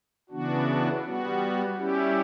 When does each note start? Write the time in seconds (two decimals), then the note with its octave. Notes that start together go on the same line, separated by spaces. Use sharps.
0.30 C#3 E3 B3 D4 F#4
1.03 G3 B3 F#4
1.77 G3 C#4 E4 G4